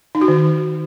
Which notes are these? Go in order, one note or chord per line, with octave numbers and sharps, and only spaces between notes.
D#4
F#4
D#3